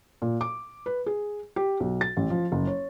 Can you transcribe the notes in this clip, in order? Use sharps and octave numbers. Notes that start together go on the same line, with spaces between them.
A#2
D6
B4
G#4
G4
B1
A6
A1
F3
F#1
C#5